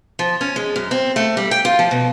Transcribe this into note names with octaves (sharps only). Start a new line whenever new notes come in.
F3
C#4
G#3
F#2
C4
A3
G3
G5
F4
F3
B2